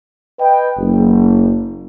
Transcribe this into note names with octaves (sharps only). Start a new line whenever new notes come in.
B4 D#5 G5
F#1